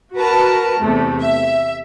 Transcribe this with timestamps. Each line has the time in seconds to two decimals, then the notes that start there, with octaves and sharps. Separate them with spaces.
0.15 F#4 A#4 B4 A5 A#5
0.81 E2 C3 A3
1.21 E5